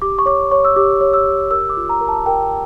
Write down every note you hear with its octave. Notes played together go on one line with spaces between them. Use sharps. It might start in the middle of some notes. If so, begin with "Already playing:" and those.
G4 D6
C#6
C#5 D6
C#5 C#6
E6
G4 D6
C#5
E6
G4
A#4 E6
D6
F4
A#5
A#4
A5
A#4 G5